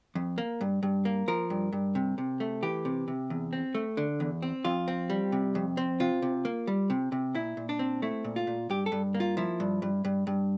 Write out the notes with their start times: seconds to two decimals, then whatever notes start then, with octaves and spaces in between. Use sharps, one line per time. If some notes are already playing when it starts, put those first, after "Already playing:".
0.15 F2
0.38 A#3
0.61 G2
0.83 G2
1.05 A#3
1.28 F3 A#4
1.50 G2
1.73 G2
1.95 C3
2.18 C3
2.40 A3
2.63 E3 G4
2.85 C3
3.08 C3
3.30 E2
3.53 C4
3.75 A3
3.97 D3
4.20 E2
4.42 C4
4.65 F2 F4
4.88 C4
5.10 G3
5.32 C3
5.55 F2
5.77 C4
6.00 C3 F4
6.22 C3
6.45 A#3
6.67 G3
6.90 C3
7.12 C3
7.35 A#2 E4
7.57 A#2
7.69 D4
7.79 C4
8.02 A3 E4
8.24 A#2
8.36 F4
8.47 A#2
8.70 G2 G4
8.86 A4
8.92 G2
9.14 A#3
9.20 F4
9.37 F3 E4
9.60 G2
9.82 G2
10.05 G2
10.27 G2